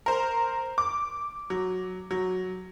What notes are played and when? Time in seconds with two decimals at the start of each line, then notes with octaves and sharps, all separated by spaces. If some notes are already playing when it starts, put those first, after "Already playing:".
0.06 A#4 C5
0.78 D6
1.50 F#3
2.11 F#3